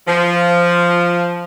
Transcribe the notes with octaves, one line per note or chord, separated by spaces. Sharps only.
F3